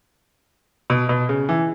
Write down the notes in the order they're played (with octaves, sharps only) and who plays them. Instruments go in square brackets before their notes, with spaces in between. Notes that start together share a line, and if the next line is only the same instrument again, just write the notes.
[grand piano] B2
B2
C#3
E3